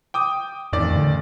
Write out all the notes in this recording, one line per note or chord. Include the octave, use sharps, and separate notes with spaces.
G5 D6 D#6
A1 F2 D#3 D5
D3